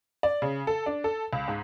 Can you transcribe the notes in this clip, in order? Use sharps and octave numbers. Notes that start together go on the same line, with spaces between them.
D5
C#3
A4
D4
A4
C#2
G#2